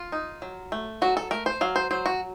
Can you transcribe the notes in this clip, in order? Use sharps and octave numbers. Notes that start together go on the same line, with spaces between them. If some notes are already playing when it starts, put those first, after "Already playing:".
Already playing: F4
D#4
F#3
A3
F#3 F#4
A4
A3 A#4
C5
F#3 F5
C5
F#3 C5
F#4